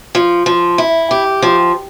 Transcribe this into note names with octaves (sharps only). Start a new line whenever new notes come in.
F3
F3
E4
G4
F3